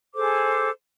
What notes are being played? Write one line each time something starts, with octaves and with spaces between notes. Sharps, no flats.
G#4 A4 C5 D6